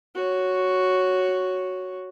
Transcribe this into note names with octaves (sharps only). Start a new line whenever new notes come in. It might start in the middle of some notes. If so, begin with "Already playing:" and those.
F#4 C#5